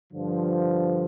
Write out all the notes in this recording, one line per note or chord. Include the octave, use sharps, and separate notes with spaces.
G2 D3 F3